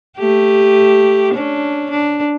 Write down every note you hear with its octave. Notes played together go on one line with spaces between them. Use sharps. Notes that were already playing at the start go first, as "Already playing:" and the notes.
A3 G4
C#4 D4
D4